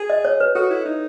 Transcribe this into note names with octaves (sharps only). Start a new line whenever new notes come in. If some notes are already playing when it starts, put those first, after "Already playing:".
Already playing: G#4
D#5
C#5
B4
F#4 A4
E4
D#4